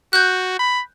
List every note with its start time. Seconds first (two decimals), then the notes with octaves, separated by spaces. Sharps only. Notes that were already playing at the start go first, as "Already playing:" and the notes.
0.13 F#4 F#6 G6
0.59 B5